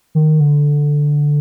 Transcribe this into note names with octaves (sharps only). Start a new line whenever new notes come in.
D#3
D3